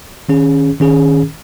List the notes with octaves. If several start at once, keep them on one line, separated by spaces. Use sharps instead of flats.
D#3 C#4 G#4
D#3 C#4 G#4